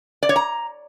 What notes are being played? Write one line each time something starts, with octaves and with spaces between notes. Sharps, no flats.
D5
C#5
A#5